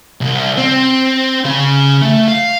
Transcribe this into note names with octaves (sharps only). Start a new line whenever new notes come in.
C2
C4
C#3 G#4
A3
F5